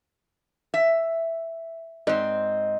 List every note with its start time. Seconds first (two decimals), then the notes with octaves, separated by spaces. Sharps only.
0.74 E5
2.07 G#2 C4 D#5